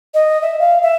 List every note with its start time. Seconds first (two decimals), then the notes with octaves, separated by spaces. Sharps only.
0.14 D#5
0.42 E5
0.59 F5
0.83 E5